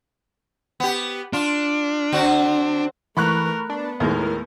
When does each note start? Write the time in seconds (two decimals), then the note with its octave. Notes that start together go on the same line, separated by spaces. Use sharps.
0.80 B3 G4
1.33 D4 F4
2.12 D3 C4 F#4
3.17 E3 A3 A#4 B5 C#6 F#6
3.70 B3 D4
4.00 D#2 A2 G#3 A#4